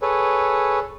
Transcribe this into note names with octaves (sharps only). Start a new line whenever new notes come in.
G#4 A4 B4 C#5